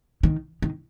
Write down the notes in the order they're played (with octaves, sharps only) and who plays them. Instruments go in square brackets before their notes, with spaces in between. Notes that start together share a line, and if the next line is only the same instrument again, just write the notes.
[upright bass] D#3
D#3